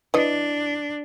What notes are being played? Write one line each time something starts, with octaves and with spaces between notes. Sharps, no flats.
E3 D4 D#5